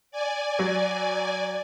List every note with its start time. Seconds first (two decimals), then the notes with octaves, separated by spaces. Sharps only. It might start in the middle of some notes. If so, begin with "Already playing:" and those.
0.11 D5 G#5
0.59 F#3